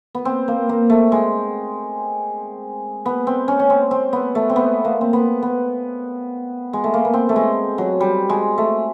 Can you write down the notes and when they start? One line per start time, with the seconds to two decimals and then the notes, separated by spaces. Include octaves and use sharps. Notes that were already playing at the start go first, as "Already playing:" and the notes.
0.15 B3
0.25 C4
0.48 A#3
0.69 A#3
0.90 A3
1.12 G#3
3.06 B3
3.27 C4
3.48 C#4
3.59 C#4
3.70 C4
3.91 C4
4.13 B3
4.35 A3
4.50 C4
4.56 B3
4.85 A#3
5.01 C4
5.13 B3
5.42 B3
6.73 G#3
6.84 A3
6.94 A#3
7.05 B3
7.14 C4
7.29 A3
7.36 G#3
7.78 F#3
8.01 G3
8.29 G#3
8.58 A3